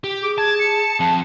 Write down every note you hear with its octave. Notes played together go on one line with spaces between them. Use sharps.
G4
G#4 D6
A5 G#6
C#7
F2 A5